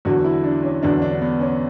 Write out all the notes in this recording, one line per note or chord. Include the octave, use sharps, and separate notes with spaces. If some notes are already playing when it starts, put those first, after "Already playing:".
E2 D3 F#3 F#4
E4
D4
C#4
E2 D3 F#3 D4
D4
B3
C#4